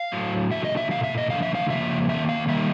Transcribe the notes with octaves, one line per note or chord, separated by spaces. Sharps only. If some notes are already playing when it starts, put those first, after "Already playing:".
Already playing: F5
A2 F#3 A3
D3 F#3 A3 E5
D#5
E5
A#2 F3 A3 F5
E5
D#5
D3 F3 A3 F5
E5
F5
C#3 F3 A#3 E5
D#3 G3 A#3 E5
F5
D#3 G3 A#3 E5